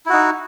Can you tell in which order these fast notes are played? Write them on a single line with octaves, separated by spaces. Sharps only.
E4 F#4 D#4